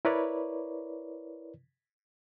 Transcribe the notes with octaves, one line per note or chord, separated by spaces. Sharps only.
E4 A#4 B4 C#5 D5